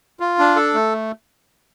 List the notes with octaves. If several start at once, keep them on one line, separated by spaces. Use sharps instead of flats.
F4
D4
A4
A3